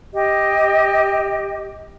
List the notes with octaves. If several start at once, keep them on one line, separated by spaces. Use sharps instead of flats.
G4 D#5